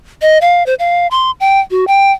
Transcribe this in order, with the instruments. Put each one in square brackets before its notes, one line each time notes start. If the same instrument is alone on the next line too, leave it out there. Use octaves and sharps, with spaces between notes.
[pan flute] D#5
F5
C5
F5
C6
G5
F#4
G5